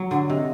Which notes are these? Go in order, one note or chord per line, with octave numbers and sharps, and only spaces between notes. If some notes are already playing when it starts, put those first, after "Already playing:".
Already playing: F#3
D3 F#5
C3 D#5